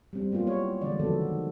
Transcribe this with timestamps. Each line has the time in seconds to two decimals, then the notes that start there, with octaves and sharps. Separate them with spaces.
0.13 G3 C4
0.31 F#3 A#3 B3 F4 G4
0.47 E4 C#5
0.81 D3 E3 G#3 D5
0.99 D#3 F3 B3 F#4 A4
1.21 D#3